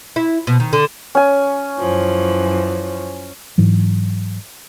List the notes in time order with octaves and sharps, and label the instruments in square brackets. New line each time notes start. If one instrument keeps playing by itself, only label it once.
[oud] E4
B2
D#3
D3
[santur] C#4 G#5
[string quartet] F#2 E3 F3
[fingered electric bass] G#2 E3 F#3